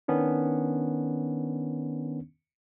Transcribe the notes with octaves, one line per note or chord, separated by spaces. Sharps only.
D#3 B3 C#4 D4